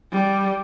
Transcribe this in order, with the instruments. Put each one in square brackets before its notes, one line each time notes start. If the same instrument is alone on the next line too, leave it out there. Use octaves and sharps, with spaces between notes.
[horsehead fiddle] G3